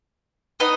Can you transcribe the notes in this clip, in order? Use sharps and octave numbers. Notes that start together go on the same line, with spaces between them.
B3 D#4 D#5